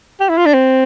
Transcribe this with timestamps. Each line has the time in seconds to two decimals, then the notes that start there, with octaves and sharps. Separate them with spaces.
0.21 G4
0.29 E4
0.37 F4
0.46 D4
0.54 C4